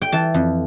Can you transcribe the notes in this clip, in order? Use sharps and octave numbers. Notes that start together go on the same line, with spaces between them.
G5
E3 A5
F2